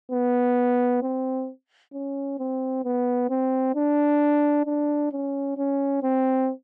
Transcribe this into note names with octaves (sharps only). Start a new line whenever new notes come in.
B3
C4
C#4
C4
B3
C4
D4
D4
C#4
C#4
C4